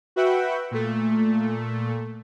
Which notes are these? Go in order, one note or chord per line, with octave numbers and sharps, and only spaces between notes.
F#4 B4 E5 F#5 G5
A#2 A3